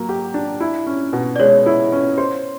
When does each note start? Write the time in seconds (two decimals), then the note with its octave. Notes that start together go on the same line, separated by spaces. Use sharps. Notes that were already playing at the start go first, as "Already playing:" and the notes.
Already playing: F#3 A#3
0.09 G4
0.34 D4
0.60 E4
0.87 C#4
1.13 B2
1.36 D5
1.39 G#3 C#5
1.66 E4
1.92 C#4
2.18 C5